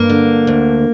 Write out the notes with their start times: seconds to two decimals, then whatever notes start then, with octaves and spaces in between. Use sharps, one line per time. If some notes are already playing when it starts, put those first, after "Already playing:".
Already playing: G2 A#3
0.10 D3
0.47 D2